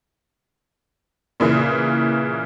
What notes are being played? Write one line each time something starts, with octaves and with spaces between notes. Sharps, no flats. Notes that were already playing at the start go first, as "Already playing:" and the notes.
A#2 C#3 E3